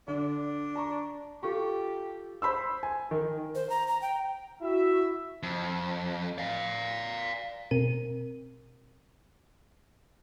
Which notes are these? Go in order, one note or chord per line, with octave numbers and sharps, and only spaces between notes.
D3 D4
A5 A#5 C#6
F4 G4 A4 C#6
C5 B5 C6 E6
G#5
D#3
C5
A#5
A#5
G5
E4 F#4 E5
F2
D5 F5
B2 C4 A#4 D#7